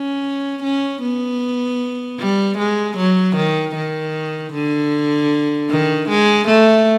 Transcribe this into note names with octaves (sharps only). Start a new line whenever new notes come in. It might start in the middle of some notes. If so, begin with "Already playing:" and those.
Already playing: C#4
C#4
B3
G3
G#3
F#3
D#3
D#3
D3
D#3
G#3
A3